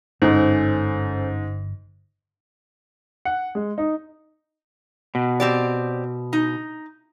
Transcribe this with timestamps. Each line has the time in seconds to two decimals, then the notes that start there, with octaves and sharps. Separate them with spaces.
0.22 G1 G#2 C#4 A4 C5
3.25 F#5
3.55 G#3
3.78 D#4
5.15 B2
5.40 C4 G4 D5
6.33 D#4